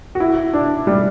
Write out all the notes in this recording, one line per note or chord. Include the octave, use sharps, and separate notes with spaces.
F#4
E4
D4
G3